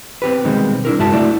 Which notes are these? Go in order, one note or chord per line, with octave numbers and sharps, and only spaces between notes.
C4 G4 B4
B2 D#3 G3 G#3 C4
D4 E4 A#4
C2 G2 G#3 F#4 E5 A5
A3 E4 F#4 D5 E5